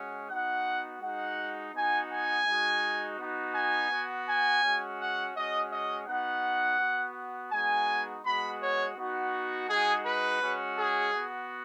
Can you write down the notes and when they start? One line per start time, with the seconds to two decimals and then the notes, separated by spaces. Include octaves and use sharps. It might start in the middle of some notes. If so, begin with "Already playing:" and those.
Already playing: G#3 C#4 F#4
0.30 B3 D#4 F#4 F#5
1.01 G#3 D#4 F#4 F#5
1.74 B3 D#4 F#4 G#5
2.10 G#5
2.47 G#3 D#4 F#4
3.19 B3 D#4 F#4
3.55 G#5
3.91 B3 F#4
4.27 G#5
4.63 G#3 C#4 F#4
5.00 F#5
5.36 G#3 C#4 F#4 D#5
5.71 D#5
6.07 B3 D#4 F#4 F#5
6.80 B3 F#4
7.52 G#3 B3 D#4 F#4 G#5
8.24 G#3 B3 F#4 B5
8.61 C#5
8.97 B3 D#4 F#4
9.69 G#3 D#4 F#4 G#4
10.05 B4
10.41 G#3 C#4 F#4
10.78 G#4
11.13 B3 F#4